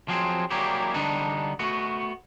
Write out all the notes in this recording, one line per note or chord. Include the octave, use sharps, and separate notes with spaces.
F3 F#3 C4 G#4
F#3 G3 A#3 E4 G4 G#4
D3 G3 B3 D4 D#4
A3 B3 F#4